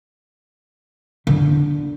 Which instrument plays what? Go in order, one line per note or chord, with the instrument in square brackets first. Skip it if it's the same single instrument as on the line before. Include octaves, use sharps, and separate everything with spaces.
[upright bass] D3